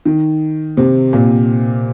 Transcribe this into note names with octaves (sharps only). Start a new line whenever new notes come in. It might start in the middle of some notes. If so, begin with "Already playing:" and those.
D#3
C3
A#2